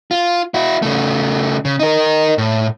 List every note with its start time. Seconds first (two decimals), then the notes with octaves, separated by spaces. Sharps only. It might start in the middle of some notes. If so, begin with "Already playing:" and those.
0.11 F4
0.54 E4 F#4
0.82 C#3 A3
1.65 C#3
1.79 D#4 A#4
2.38 A2